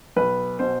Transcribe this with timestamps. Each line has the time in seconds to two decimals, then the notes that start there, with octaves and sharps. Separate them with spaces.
0.16 B1 B4
0.59 B2 C5